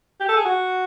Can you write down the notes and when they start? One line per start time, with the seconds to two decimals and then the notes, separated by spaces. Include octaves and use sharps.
0.20 G4
0.29 A4
0.36 G#4
0.45 F#4